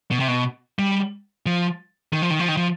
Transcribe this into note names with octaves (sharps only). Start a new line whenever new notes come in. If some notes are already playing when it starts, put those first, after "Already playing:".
B2
C3
B2
G3
F3
D#3
F3
D#3
F3
D#3
F3